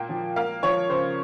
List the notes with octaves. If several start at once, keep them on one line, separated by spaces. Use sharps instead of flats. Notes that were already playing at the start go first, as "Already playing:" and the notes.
Already playing: A#2 A#3 G5
F3
A#3 F5
F3 C#5
C#3 C5